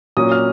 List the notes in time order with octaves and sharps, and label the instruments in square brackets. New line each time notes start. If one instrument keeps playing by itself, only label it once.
[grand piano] A#2 F#3 A#3 C#4 D#6
F6